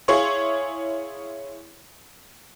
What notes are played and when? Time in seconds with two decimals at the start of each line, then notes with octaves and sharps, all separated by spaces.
0.08 E4 G#4 C#5 F5 C6 C#6